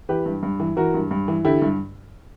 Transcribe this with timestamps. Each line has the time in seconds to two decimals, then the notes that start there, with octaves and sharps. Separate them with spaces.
0.09 E3 G4 B4
0.26 G2
0.43 G2
0.60 E3
0.77 E3 F#4 A#4
0.94 G2
1.11 G2
1.28 E3
1.45 D3 E4 G4
1.62 G2